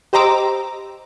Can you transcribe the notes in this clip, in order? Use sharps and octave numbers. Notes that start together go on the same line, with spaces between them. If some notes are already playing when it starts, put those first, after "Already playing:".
G4 C5 D#5 A#5 D6 E6